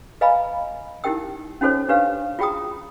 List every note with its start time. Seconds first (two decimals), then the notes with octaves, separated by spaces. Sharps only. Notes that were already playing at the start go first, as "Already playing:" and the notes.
0.21 B4 D#5 F5 G#5 A#5 B5
1.04 D#4 E4 G4 A#4 G5 E6
1.61 C#4 D#4 F#4 A4 C5 C#5
1.89 D4 G4 B4 C#5 F5
2.39 F4 F#4 G#4 G5 A#5 D#6